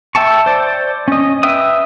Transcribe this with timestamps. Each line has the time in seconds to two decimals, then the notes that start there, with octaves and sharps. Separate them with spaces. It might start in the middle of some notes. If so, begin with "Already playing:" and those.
0.15 E5 G5 A5 C#6
0.46 C5 D5
1.08 C#4 D#5
1.43 B4 E5 G5 D#6